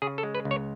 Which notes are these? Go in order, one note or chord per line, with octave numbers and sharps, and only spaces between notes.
C#3 G#4
A4
G#3
B4
C#2
C#5